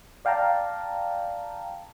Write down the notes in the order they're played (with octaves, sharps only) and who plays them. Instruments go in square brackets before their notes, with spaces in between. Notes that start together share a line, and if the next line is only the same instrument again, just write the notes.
[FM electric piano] D5 F5 G5 A5 A#5